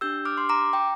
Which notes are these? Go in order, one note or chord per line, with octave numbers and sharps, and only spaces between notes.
D4 G4 E6 G6
D6 F6
C6
A#5 D6
G5 A#5